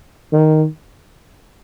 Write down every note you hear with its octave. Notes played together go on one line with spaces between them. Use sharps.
D#3